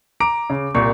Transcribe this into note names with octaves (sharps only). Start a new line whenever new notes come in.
A#5 D6 D7
C#3
C2 A#2 C#6